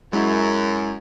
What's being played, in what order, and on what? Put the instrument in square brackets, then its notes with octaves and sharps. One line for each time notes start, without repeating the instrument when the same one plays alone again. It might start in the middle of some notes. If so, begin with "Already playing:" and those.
[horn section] F#2 [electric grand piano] G#3 E4